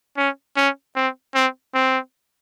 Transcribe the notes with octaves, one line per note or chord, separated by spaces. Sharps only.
C#4
C#4
C4
C4
C4